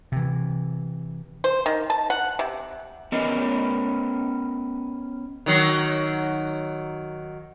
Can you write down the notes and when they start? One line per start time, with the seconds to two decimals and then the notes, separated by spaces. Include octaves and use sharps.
0.12 C3 E3
1.44 C5
1.66 D#3
1.90 A5
2.10 F#5
2.39 C3
3.12 B3 C#4 A#4 D#5
5.46 D#3 F#3